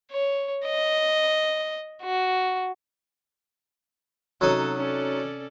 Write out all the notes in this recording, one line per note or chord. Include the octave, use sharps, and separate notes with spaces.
C#5
D#5
F#4
C3 F#3 C#4 D#4 A4
C#4 A4 D5